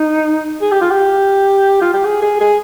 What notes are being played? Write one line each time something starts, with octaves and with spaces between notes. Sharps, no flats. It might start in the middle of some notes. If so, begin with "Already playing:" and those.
Already playing: D#4
G#4
G4
F4
G4
F4
G4
G#4
G#4
G#4